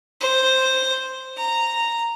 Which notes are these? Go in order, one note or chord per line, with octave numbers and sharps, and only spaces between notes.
C5
A#5